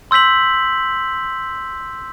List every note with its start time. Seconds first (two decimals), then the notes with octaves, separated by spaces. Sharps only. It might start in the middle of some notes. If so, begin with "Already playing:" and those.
0.11 C6 E6 G6 B6 F#7